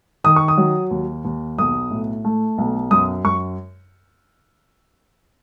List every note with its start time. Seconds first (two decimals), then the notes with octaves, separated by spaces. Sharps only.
0.24 D#3 D#6
0.36 C#6
0.48 D#6
0.57 F#3
0.91 D#2
1.25 D#2
1.58 B1 D#6
1.91 A2
2.25 A3
2.58 B1
2.91 F#2 D#6
3.25 F#2 C#6